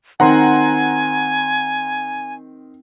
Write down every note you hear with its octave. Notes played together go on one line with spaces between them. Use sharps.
D#3 C4 F#5 G#5 A#5 C6